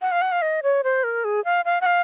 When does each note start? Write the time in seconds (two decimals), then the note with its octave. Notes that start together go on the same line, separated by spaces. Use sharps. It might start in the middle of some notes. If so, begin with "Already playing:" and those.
0.02 F#5
0.12 F5
0.22 F#5
0.32 F5
0.42 D#5
0.63 C#5
0.84 C5
1.04 A#4
1.25 G#4
1.45 F5
1.65 F5
1.81 F#5
1.86 F5